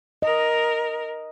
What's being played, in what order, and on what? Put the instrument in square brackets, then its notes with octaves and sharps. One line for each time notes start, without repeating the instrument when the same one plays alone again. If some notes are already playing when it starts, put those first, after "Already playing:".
[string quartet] A#4 [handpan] D#5